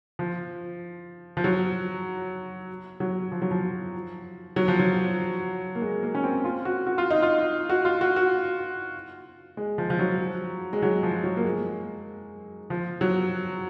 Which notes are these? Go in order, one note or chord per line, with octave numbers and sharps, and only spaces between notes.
F3
F3
F#3
F#3
F3
F#3
F3
F#3
F3
F#3
A#3
G#3
A#3
C#4
C4
F4
F#4
F#4
F4
D#4
F4
F#4
F4
F#4
F#4
G#3
F3
F3
F#3
G#3
F#3
F3
F#3
A#3
G#3
F3
F#3